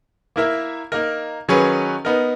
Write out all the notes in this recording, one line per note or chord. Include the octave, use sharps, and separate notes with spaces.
A#3 E4 A#4 E5
A#3 D#4 A#4
D#3 F#3 C#4 G#4 B4
B3 D#4 A#4